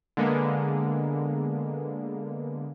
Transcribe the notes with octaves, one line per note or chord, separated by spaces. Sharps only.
D3 G#3 A#3 B3